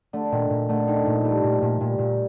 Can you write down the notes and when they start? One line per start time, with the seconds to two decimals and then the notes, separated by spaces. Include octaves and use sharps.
0.13 D3 A3
0.32 A#2 D#3
0.50 A#2
0.69 D3 A3
0.87 D#3 D#4
1.06 A#2 F3
1.24 G3 A3
1.44 A#2
1.53 F3
1.62 A#2
1.80 A#2 G3
1.98 A#2